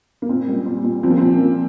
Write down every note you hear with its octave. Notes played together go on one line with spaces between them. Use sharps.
A#3
A#2 C4
G3
A#2
A#2
F3 C4
A#3
A#2 C4
F3